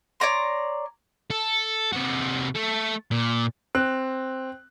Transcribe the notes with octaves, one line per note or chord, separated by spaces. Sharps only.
C#5 D5 A#5 C6
A4
C3 F#4
A3 A4
A#2
C4 F#6